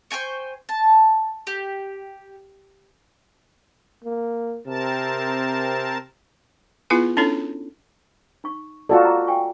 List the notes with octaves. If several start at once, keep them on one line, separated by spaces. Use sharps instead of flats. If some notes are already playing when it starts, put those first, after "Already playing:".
C5 G5 G#5 C#6
A5
G4
A#3
C3 C4 A#4 A5
B3 E4 F4 G#4 B4 G#5
C#4 D4 E4 A4 C#5
D#4 C#6
F4 F#4 A4 D5 D#5
A#5 D6
G5 G#5 C#6